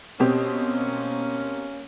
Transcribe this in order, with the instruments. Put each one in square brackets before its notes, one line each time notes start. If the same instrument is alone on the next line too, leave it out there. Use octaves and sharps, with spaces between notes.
[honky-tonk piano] B2 C4 G4 [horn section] A#3 C#4